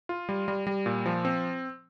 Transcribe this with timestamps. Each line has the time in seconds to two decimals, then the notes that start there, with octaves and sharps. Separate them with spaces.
0.09 F4
0.29 G3
0.48 G3
0.67 G3
0.86 A#2
1.06 F3
1.25 C4